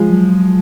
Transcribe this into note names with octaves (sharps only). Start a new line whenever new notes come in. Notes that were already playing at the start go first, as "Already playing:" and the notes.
Already playing: F3 G#3
F#3